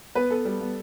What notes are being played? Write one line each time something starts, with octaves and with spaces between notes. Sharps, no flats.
B3 B4
B3 A4
G3
B3